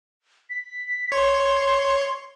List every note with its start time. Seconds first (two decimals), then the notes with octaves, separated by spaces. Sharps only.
0.50 B6
1.12 C#5 C6